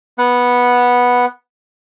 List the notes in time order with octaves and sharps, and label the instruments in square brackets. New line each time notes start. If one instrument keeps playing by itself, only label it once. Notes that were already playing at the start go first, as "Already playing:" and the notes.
[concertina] B3 F#5